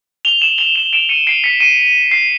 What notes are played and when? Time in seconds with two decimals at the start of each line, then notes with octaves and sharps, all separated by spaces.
0.25 F7 G7
0.42 E7 F#7
0.58 F7 G7
0.75 E7 F#7
0.93 D7 E7
1.09 C#7 D#7
1.27 C7 D7
1.44 B6 C#7
1.60 C#7 D#7
2.11 C7